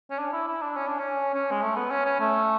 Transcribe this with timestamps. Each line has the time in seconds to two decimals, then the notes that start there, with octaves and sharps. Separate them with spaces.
0.10 C#4
0.18 D4
0.33 E4
0.47 E4
0.62 D4
0.76 C#4
0.87 D4
0.99 C#4
1.34 C#4
1.51 G#3
1.62 A3
1.76 B3
1.90 C#4
2.05 C#4
2.19 A3